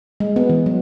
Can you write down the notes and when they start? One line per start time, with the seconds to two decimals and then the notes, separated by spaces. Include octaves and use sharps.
0.20 G#3
0.36 B3
0.50 E3
0.66 F#3